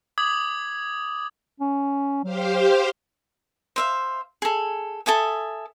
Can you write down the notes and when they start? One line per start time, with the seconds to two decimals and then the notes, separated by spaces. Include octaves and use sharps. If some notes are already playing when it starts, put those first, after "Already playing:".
0.18 D6 D#6 G#6 F#7
1.60 C#4
2.24 F#3 G4 C5 F5
3.76 C5 E5 F5
4.42 G#4 A4
5.06 A4 E5 G#5 D#6